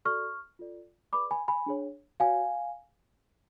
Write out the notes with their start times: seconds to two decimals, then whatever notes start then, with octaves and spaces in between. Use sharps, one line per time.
0.05 F#4 A4 D5 C#6 F6
0.59 F4 A4 D5
1.13 G#4 B4 D5 B5 D6
1.31 G#5 B5
1.48 G#5 B5
1.66 D4 G#4 C#5
2.20 F#4 C#5 F5 G#5